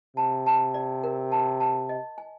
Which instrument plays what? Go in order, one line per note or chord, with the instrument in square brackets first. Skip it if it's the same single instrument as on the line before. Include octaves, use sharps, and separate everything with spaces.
[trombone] C3 [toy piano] A5
[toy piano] A5
D5
A#4
A5
A5
D#5
G#5